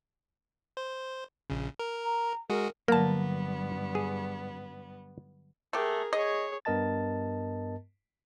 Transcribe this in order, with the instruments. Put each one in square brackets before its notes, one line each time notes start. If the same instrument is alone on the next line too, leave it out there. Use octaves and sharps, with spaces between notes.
[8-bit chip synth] C5
A#1 C#3
A#4
[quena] A#5
[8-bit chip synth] G#3 F#4 G#4 [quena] A#4
[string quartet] G2 B3 [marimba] D3 F#3 [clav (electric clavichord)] A#3 [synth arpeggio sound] A#4 A5
[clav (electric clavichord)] G#4
[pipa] A3 G4 [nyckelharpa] G#4 A#4
[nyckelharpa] G#4 C#5 [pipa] D#5
[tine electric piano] G2 B3 A#4 D#5 A5 A6